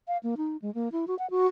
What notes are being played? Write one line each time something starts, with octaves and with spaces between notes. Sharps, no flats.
F5
A#3
D#4
G#3
A#3
E4
F#4
F#5
F#4